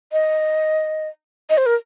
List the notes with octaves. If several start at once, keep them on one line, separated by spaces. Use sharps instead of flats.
D#5
D#5
C5
A#4